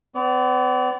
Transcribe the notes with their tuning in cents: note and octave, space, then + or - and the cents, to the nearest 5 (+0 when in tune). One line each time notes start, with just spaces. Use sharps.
B3 +40 D5 -35